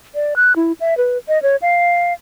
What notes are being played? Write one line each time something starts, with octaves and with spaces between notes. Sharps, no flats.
D5
F#6
E4
E5
B4
D#5
C#5
F5